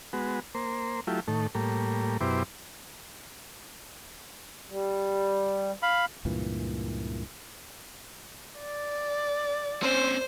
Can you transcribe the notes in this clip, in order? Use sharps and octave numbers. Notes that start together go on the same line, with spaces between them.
G#3 B3 F#4
A#3 C5
F#3 A3 E4 F4 G4
A2 D#3 A3
A2 G3 A#3
F#2 B2 E4 G4 C5 D6
G3
F5 B5
C#2 G2 A#2 E3
D5
C4 C#4 C5